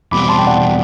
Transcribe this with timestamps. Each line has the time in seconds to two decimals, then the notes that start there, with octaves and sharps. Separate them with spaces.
0.12 E2 B2 G3 C4 B5 D6
0.29 A5 C6
0.38 G5
0.47 D5 F#5